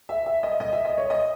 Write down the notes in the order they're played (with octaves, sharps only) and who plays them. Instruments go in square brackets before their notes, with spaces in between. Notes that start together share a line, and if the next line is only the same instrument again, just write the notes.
[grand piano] E5
E5
D#5
D#5
E5
D#5
C#5
D#5